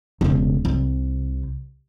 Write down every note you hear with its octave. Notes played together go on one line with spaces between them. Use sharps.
E1 C#3
C2